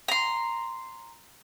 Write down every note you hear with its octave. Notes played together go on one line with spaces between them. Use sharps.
A#5 C6